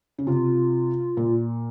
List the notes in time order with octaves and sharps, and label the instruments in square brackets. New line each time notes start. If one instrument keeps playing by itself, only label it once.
[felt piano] C#3
[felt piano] C3 [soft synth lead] F4
[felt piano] A#2